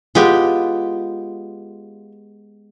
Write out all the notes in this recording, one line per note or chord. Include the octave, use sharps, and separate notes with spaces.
G#3 B3 F4 G4